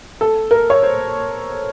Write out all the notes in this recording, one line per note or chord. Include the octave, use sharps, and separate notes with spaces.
A4
A#4
C#5
C5